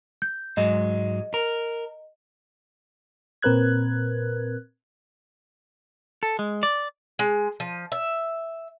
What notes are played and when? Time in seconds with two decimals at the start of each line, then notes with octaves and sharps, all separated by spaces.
0.22 G6
0.57 G#2 F#3 G#3 D#5
1.34 A#4
3.42 A#2 C4 A#4 B4 F#6 G#6
6.23 A4
6.39 G#3
6.63 D5
7.19 G#3
7.60 F3
7.92 E5